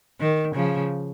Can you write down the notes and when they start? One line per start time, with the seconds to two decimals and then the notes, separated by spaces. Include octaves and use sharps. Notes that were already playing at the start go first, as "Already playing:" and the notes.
0.20 D#3
0.55 C#3 F3